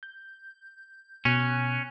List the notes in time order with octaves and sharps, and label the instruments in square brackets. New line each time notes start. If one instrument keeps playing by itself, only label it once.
[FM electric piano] G6
[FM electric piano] B2 F#6 [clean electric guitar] C#4